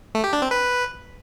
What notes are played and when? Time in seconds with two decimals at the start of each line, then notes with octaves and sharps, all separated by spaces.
0.15 A3
0.24 G4
0.33 D4
0.42 C4
0.51 B4